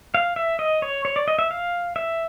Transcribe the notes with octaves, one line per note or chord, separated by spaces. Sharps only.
F5
E5
D#5
C#5
C#5
D5
D#5
E5
F5
E5